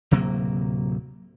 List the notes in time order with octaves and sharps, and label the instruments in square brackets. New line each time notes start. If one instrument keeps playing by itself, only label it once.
[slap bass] D1 C3 F#3 A#3